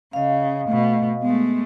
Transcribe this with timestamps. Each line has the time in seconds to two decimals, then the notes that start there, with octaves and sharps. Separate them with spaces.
0.13 C#3 D#5 F5
0.69 B2 A3
1.23 G#3 A3 B3